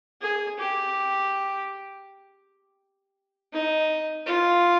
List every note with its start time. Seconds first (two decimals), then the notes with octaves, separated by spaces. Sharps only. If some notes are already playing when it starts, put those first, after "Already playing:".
0.22 G#4
0.59 G4
3.53 D#4
4.27 F4